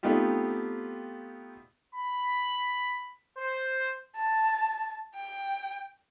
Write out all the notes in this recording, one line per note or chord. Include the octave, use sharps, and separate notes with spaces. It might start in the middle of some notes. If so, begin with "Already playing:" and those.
A3 B3 C4 D#4 F4 G4
B5
C5
A5
G5